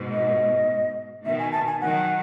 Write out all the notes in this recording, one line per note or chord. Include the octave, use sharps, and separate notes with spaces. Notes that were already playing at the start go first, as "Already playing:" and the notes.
Already playing: G#2 B2
D#5
B2 D#3 E5
G#5
A5
G#5
D#3 F#3 F#5